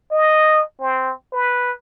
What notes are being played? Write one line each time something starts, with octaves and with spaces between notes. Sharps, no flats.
D#5
C4
B4